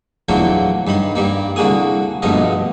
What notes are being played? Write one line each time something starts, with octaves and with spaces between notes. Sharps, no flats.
E2 A#2 D3 F#3 A3 A#3
G2 D#3 B5 C6
G2 G3 A#3
C2 D3 A#3 F#4 G#4 D#6
A#1 G2 B2 A3 F4 D#5